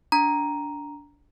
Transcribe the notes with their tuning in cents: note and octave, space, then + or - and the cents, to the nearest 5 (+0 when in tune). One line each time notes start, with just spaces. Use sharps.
D4 -20 A#5 +0